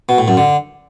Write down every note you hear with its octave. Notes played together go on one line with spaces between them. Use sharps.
B2
A2
F#2
D3